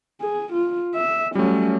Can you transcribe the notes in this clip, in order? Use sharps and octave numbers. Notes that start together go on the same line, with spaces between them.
G#4
F4
E5
F#3 G3 A3 C#4